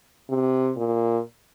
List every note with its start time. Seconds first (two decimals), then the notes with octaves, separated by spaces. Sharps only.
0.30 C3
0.77 A#2